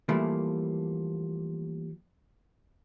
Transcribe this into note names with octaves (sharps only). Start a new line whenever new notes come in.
E3 F3 G3 A3 A#3